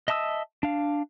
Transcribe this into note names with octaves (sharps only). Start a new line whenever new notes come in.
D#5 E5 A5 D#6 E6
D4 F5